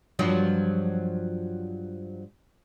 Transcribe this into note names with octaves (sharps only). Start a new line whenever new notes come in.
G2 F3 F#3